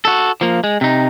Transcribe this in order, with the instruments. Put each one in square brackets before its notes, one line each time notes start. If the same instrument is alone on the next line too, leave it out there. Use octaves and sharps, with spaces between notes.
[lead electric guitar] F#4 A4
F3 A#3
G#3
C3 D#4